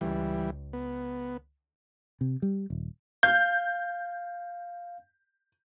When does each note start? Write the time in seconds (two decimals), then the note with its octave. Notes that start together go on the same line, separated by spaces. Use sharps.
0.01 C#2 E3 G3
0.73 B3
2.21 C3
2.42 G3
2.70 D#1
3.23 F5 G6